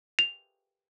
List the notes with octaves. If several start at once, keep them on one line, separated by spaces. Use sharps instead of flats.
F7